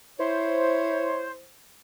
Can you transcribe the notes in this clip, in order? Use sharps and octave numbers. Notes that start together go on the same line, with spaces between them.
E4 C5 C#5